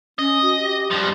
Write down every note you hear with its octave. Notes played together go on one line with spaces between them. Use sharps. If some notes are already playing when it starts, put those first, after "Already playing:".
C#4 D#5
F#4
G4
G2 F3